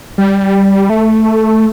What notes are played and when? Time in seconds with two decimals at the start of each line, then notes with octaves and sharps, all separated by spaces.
0.18 G3
0.90 A3